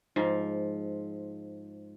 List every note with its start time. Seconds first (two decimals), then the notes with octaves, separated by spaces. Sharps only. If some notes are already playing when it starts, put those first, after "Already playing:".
0.16 G#2 F3